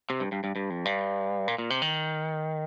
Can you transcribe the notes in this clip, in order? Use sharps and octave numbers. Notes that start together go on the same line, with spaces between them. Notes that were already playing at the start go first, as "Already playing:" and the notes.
C3
G2
G2
G2
G2
F2
G2
A#2
A#2
C3
D#3